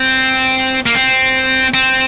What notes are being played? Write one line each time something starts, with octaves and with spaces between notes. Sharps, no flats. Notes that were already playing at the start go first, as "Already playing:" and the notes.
Already playing: C4
A#3
C4
C4